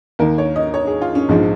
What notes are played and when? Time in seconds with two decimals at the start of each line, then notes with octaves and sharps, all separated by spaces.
0.19 D#2 D#3 A#4
0.38 C#5
0.56 D#5
0.74 C#5
0.87 G#4
1.02 F4
1.15 C#4
1.29 A#1 G#2 F3 G#3